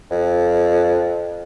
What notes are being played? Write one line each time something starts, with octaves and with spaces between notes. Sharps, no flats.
F2